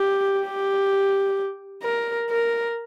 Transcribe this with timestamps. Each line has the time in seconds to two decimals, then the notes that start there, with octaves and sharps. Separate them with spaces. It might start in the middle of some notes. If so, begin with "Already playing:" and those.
Already playing: G4
0.41 G4
1.83 A#4
2.30 A#4